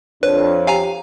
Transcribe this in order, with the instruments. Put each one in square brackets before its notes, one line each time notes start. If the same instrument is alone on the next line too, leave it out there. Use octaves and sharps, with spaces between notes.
[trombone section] F2 [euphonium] D4 [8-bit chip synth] B4 [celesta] C#5
[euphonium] G4 [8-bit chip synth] F5 G#5 A#5